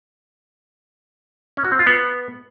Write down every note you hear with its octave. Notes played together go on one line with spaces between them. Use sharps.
C#4
F#4
C4
F4
B3